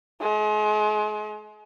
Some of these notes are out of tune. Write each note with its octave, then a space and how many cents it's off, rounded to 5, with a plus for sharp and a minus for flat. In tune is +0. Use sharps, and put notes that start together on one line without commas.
G#3 +35